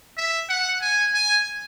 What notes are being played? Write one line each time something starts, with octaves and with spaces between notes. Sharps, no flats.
E5
F#5
G#5
G#5